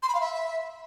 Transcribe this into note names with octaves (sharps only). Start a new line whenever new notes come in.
C6
B5
F5
E5